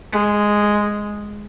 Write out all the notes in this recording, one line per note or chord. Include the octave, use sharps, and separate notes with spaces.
G#3